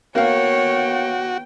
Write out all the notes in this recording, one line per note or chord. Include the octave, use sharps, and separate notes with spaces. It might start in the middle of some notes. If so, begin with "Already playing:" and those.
A#3 B3 F#4 C#5 F5 G5